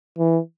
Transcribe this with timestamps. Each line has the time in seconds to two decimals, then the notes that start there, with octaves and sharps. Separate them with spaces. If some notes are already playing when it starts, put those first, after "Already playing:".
0.18 E3